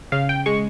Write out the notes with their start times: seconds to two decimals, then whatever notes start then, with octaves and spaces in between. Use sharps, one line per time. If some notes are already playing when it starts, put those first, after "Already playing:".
0.12 C#3 F5
0.29 G5
0.46 G#3 C#6